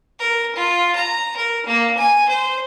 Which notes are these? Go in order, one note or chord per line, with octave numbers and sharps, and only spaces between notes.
A#4
F4
A#5
A#4
A#3
G#5
C5